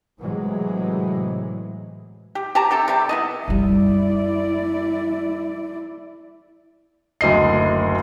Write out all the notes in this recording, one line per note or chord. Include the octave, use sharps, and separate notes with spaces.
A2 C3 E3 F#3 G#3
G4
G4 C#5 A5 A#5
C3 G4 A4
C3 G3 G4
B3 E4 D#5
F#2 G3 E4 D5
F#1 D2 D#5 C7